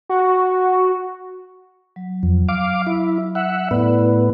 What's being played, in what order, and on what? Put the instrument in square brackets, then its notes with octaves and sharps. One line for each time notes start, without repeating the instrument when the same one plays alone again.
[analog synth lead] F#4
[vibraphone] F#3
[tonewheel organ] F2
F5 D6
E4
E5 F#5
[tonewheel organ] A2 B3 [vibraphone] E4 D5